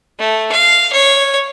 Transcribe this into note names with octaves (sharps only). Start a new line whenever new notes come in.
A3
F5
C#5